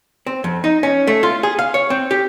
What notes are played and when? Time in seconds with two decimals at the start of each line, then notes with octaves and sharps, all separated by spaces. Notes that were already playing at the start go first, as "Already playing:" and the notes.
0.26 C4
0.44 F2
0.64 D#4
0.83 C#4
1.07 A3
1.23 F4
1.43 G#4
1.59 F5
1.74 C#5
1.90 C4
2.11 G4